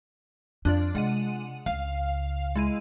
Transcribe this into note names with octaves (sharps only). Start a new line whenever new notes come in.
F2 D4 F4 D5
C3 G#3 F#5 D#7
C#2 F5
G#3 E4 D#7